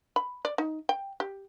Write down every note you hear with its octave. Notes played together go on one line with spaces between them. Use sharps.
B5
D5
D#4
G5
G4